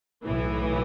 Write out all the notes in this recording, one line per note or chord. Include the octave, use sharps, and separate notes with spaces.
B1 A2 E3